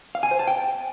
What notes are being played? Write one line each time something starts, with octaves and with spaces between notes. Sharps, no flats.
F5
G#5
C5
A5
G5